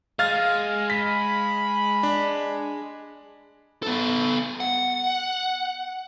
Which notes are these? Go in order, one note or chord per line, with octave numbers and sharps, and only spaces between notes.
G#3 F5 F6 A6
B5 B6
D4
B3 A4
F#5